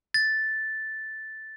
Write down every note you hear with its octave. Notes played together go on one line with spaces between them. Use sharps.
A6